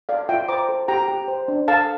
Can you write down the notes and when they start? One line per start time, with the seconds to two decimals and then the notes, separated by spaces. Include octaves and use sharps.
0.09 A4 D5 F5
0.29 F4 E5 G5
0.49 C5 A#5 D6
0.69 A4
0.88 G4 G5 A#5
1.08 G4
1.28 C5
1.48 D4
1.68 A4 F5 A5